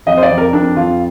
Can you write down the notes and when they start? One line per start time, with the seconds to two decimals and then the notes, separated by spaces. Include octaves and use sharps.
0.06 F2 D#5
0.17 C5
0.23 D5
0.30 F2
0.38 A#4
0.53 F2 D4
0.77 F2 F4